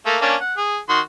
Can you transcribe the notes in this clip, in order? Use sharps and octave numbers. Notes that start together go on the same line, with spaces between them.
A3 A#3
A#3 C#4 D4
F#5
G#4
D#3 F#4 C6